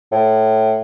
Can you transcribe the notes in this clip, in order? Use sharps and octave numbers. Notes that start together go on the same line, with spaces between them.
A2